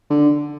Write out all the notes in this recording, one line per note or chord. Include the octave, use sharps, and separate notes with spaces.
D3